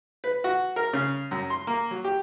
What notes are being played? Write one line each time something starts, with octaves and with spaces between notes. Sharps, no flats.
B4
F#4
A#4
C#3
F#2
C6
A#3
F#3
G4